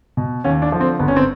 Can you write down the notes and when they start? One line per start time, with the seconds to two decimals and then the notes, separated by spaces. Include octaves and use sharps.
0.17 B2
0.44 D#2 C#4
0.62 D4
0.72 D3 F3
0.81 C4
0.99 G1 B3
1.08 C#4
1.16 C4